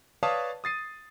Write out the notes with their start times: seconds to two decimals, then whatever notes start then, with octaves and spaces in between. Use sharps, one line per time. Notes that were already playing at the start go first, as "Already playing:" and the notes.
0.23 B4 C#5 D5 F5 A5 D#6
0.64 D#6 A6 C7 D#7